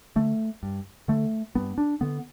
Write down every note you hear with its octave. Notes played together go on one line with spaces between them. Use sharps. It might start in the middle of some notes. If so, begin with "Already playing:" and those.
D3 A3
G2
D3 A3
G2 B3
D4
D3 B3